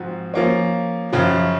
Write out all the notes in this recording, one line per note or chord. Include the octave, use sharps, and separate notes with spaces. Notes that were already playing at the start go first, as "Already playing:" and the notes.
Already playing: G#2 F3 C4 F#4
F3 A#3 C#4
F#2 C#3 F3